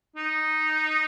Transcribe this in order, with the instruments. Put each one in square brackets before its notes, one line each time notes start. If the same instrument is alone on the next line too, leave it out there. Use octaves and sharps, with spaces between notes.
[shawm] D#4